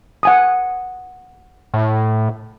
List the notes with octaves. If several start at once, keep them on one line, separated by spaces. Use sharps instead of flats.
F#5 G#5 D#6
A2